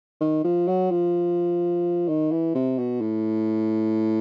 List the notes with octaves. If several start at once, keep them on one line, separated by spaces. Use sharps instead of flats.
D#3
F3
F#3
F3
D#3
E3
C3
B2
A2